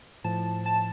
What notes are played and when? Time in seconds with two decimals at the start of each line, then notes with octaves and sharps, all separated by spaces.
0.24 A2 F3 A5
0.66 A5